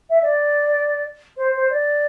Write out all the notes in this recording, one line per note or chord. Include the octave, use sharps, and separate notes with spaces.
E5
D5
C5
C5
D5